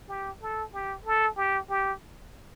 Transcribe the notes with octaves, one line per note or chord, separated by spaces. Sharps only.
G4
A4
G4
A4
G4
G4